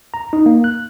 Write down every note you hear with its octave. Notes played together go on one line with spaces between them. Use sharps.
A#5
D#4
A#3
F#6